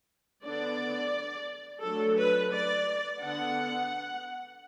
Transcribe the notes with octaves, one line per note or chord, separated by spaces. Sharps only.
D3 B3 D4 D5
F#3 A3 D4 A4
B4
D5
D3 B3 D4 F#5